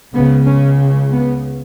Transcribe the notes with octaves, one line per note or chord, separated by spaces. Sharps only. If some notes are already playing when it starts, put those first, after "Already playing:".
C#2 C#3 B3
C#4
B3